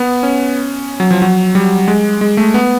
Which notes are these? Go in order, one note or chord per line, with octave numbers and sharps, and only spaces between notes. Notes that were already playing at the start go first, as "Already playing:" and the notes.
Already playing: B3
C#4
F#3
F3
F#3
G3
G#3
G#3
A3
B3